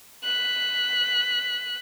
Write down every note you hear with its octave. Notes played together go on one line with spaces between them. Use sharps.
F#6 B6